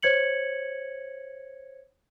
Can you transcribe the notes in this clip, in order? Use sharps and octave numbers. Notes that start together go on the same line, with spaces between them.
C5 C#5 G#6 C#7 F#7